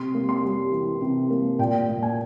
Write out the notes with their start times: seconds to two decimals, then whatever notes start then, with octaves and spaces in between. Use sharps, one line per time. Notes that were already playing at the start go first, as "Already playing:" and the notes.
Already playing: C3 C6
0.14 A#3
0.29 C6
0.43 G3
0.72 E3
1.01 C3
1.30 A#3
1.59 A#2 G5
1.88 A#2
2.03 G#5